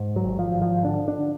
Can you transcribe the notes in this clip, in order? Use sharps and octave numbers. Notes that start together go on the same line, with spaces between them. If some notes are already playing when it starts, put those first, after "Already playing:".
Already playing: G#2
F#3
G#1
F3
G#1
F3
D3 D4
D4